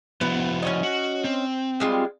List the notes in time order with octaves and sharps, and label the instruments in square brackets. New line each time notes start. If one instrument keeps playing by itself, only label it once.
[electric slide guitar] F3 E4 F#4 [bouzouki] B3
[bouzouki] C#4 C#5 D#5
[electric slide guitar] F#4
C4
[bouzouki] G3 G#3 F4